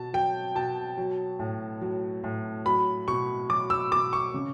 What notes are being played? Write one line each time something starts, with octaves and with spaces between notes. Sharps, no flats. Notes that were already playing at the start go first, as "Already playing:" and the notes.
Already playing: B2 A5
F#3 G5
B2 A5
F#3
A2
F#3
A2
F#3 B5
B2 C#6
F#3 D6
E6
B2 D6
C#6
C#3